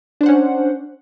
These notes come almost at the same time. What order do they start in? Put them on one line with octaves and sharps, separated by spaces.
D4 C5 F#5 C#4